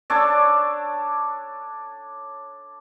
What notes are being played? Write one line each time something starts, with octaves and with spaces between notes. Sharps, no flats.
D4 A4 C#5 D5